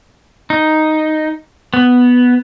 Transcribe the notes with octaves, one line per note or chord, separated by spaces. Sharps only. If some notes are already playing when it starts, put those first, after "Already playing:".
D#4
B3